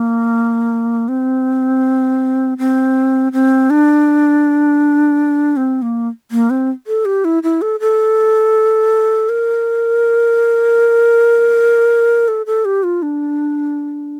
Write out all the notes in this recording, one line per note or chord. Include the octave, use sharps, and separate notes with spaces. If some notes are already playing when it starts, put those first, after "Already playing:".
Already playing: A#3
C4
C4
C4
D4
C4
A#3
A#3
C4
A4
G4
E4
E4
A4
A4
A#4
A4
A4
G4
F4
D4